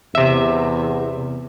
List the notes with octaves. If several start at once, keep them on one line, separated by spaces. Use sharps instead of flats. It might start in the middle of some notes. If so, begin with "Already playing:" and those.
E2 C3 E5